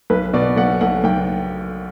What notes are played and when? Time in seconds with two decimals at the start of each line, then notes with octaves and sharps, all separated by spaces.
0.10 B1 B4
0.33 B2 D5
0.57 B1 F#5
0.81 B1 F#5
1.04 B1 G5